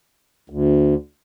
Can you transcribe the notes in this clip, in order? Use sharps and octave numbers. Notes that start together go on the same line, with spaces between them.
D2